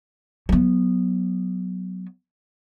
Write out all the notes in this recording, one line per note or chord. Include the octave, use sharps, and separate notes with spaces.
F#3 B3